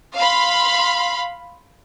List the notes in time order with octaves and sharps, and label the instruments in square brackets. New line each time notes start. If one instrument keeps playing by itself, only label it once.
[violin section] F5 B5 C6